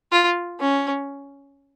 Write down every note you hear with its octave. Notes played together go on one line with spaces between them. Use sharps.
F4
C#4